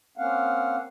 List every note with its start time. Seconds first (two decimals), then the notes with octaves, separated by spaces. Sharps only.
0.18 A#3 C4 C#4 F5 F#5